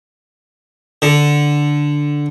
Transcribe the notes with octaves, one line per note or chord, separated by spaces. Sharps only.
D3